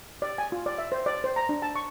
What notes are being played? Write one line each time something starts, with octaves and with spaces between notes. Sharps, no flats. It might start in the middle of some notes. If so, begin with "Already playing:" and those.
D5
G#5
F4
D5
E5
C5
D5
C5
A#5
D4
A5
C#6